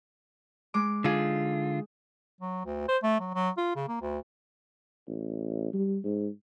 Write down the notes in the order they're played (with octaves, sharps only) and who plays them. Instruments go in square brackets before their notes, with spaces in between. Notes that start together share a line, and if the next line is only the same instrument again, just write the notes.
[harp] G#3 D6
[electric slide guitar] D3 F4 [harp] D#4 G#4
[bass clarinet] F#3
D2
C5
A3
F#3
F#3
F4
C#3
A#3
D2
[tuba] A1
G3
G#2